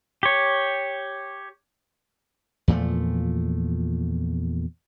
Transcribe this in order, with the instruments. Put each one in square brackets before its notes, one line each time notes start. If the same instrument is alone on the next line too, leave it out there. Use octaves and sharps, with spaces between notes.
[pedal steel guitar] G4 C#5
[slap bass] E2 A#2 F3 A3